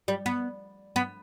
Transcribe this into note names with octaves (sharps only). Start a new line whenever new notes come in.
G3
B3
B3